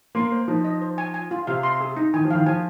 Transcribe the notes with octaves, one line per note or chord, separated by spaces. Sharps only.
A#3 C6
C5
F3 D#4
D#5
C5
G#5
G#5
F4
C3 F5
C6
G#4
D#4
D#3 G#5
F3
D#3 F5
F3 G#5